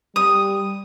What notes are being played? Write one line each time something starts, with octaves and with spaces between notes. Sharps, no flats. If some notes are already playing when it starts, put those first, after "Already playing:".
G3 D#6